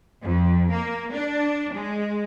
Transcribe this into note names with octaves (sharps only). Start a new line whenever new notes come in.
F2
A#3
D4
G#3